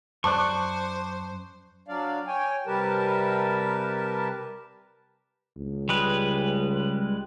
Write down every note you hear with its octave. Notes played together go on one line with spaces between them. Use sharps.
F#2 C5 D5 A5 C#6 D6 F#6
F#3 D4 D5 F5
C#5 G5 G#5
C3 G3 G4 A#4 B4 A5
C#2
G3 G#3 B4